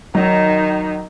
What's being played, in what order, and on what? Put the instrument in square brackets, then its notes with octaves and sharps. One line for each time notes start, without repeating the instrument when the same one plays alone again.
[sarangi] D#3 [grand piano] F#3 [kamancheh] D#4